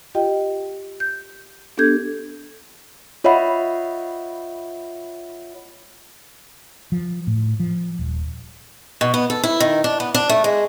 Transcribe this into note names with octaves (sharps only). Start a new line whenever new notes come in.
F4 G4 D#5 G5
G6
B3 D4 G4 A4 G6 G#6
F4 C#5 D#5 E5 F#5 B5
F3
A2
F3
D#1
B2
B3
A4
E4
D#3
D4
B3
D4
A3
G#3